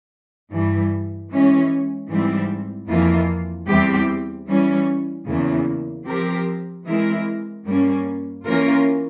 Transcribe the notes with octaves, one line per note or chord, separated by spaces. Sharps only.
G2 E3 G3
E3 G#3 C#4
G#2 E3 G3 C4
F2 E3 A#3 F4
E2 E3 G3 C4 G4
E3 G3 C#4
E2 C#3 E3 A#3
F3 C4 G4 A#4
E3 G#3 C4 E4 A#4
G2 G3 A#3 C#4
E3 A#3 C#4 F4 A#4